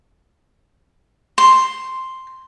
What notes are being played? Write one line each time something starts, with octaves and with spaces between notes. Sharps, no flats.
C6